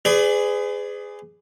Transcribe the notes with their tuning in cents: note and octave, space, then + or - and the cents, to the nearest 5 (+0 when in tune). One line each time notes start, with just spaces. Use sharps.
G#4 +0 B4 +40 D5 +0